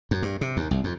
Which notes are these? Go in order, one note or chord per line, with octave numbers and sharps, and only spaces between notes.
F#2
G2
C3
D#2
C2
F2